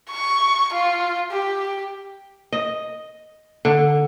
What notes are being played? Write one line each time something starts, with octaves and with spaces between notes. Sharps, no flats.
C#6
F4
G4
D#5
D3